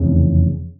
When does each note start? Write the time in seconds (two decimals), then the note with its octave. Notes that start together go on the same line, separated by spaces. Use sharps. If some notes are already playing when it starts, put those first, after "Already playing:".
Already playing: F1 E2 C#3 C4